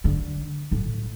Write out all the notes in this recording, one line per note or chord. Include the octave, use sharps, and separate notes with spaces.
D3
A2